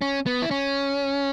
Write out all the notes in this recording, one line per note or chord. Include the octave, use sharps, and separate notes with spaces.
C#4
B3
E4
C#4